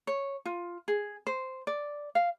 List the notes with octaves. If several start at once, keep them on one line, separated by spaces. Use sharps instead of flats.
C#5
F4
G#4
C5
D5
F5